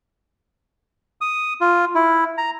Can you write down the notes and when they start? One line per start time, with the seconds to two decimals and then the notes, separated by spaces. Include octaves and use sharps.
1.21 D#6
1.61 F4
1.95 E4
2.38 A#5